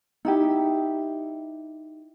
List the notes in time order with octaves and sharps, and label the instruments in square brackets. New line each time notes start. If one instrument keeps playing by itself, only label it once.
[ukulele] D#4 E4 G4